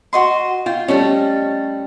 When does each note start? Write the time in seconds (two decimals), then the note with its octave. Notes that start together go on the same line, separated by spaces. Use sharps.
0.13 F#4 D#5 C6
0.66 F4 G5
0.88 G3 A3 C#4 D#5